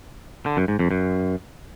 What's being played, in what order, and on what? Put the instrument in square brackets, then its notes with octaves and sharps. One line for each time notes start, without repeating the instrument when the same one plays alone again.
[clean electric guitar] D3
F#2
G#2
F2
F#2